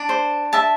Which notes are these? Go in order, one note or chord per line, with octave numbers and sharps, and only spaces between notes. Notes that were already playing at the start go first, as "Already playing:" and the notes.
Already playing: D4
C5
E5 A5